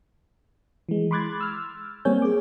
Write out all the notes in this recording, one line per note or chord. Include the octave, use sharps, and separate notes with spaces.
E3 G#3
B5 C6 D6 F#6 G#6 A6
E6 F6
G3 A#3 C4 C#5 G#5 G6
G#4 D6